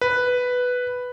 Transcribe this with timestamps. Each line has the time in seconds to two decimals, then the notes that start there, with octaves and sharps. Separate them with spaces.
0.01 B4